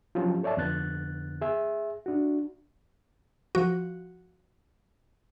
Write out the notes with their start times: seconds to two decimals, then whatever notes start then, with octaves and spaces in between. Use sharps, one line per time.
0.15 F3 F#3 B3 C#4 F4 G4
0.43 A4 C#5 D5 E5 A5
0.57 F2 D3 B3 F#6 A6
1.41 G#4 E5
2.06 D4 F#4
3.55 F3 F#4